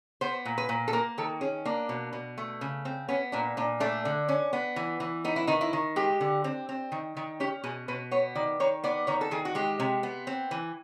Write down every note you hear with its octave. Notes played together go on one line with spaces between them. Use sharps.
B3 C5
A#2
B4
A#2
A4
A#3 A#4
D#3 A4
C#4 G#4
A#3 D4
B2
B2
A3
C#3
C4
B3 C#4
A#2 D4
A#2 D4
A3 D4
D3
C#4
B3
E3
E3
B3 D#4
E4
D#3 D#4
E4
D#3
G#3 G4
D3
C4
C4
D#3
D#3
C#4 G4
B2 G#4
B2 B4
B3 C#5
D#3 D5
D#3 C#5
B3 D5
D#3 C#5
A4
D#3 G#4
F#4
G#3 G4
C3
B3
C4
E3